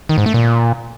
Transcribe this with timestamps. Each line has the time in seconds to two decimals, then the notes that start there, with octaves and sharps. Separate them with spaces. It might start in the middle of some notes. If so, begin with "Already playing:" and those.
0.09 D#3
0.18 G#2
0.26 A3
0.34 A#2